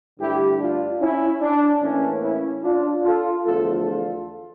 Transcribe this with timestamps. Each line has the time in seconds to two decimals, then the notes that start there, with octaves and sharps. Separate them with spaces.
0.19 G2 D3 A3 E4 G4
0.60 D4 F4
1.01 C#4 E4
1.41 D4
1.82 A2 E3 A#3 C#4
2.23 C#4 E4
2.63 D4 F4
3.04 F4 A4
3.45 E2 D3 F3 A3 F4 A4
3.85 F4 A4